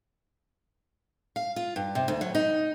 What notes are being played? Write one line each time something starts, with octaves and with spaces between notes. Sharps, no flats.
F5
F4
G2
C3
D2
F#3
D#4